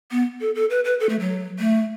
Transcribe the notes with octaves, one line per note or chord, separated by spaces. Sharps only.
B3
A4
A4
B4
B4
A4
A3
F#3
A3